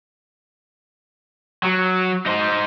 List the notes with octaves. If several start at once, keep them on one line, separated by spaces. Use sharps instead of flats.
F#3
D#4 C5